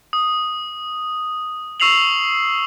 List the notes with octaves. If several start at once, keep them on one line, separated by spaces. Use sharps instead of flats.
D#6
C#6 E6 C7 F7 F#7